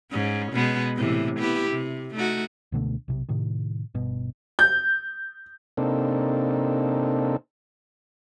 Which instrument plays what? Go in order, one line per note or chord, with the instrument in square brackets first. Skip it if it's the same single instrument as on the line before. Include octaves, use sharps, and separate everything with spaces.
[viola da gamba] G#2 C#4
B2 G#3 B3
A2 C3 E3
B3 E4 G4
C3
A3 D#4 F#4
[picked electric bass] C#2 B2 D3 A3
B1 C3
A2 C3 D#3
G1 B2
[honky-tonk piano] G6
[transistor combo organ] C3 A#3 C4 D4 D#4 A4